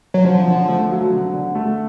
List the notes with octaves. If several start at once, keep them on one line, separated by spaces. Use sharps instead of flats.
F#3
D3 F3
D3
A3
F#3
D3
D3
A3